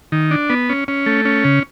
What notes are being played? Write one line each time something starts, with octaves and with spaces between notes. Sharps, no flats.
D#3
D4
B3
C#4
C#4
A3
C#4
C#3